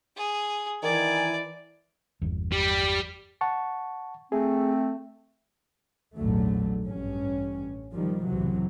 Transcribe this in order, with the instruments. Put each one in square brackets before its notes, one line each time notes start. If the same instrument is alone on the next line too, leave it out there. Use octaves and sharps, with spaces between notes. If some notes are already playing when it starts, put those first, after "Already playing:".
[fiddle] G#4
[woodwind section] D#3 G#5 [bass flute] E3 [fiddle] D5
[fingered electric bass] G1 E2
[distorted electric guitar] G3
[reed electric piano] F#5 A5 C#6
[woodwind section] A3 C4 [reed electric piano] G#4
[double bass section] A#1 E2 G#2 D3 F#3 A3
A1 G2 C#4
B2 D#3 F3 G3
C#2 A2 C3 E3 F#3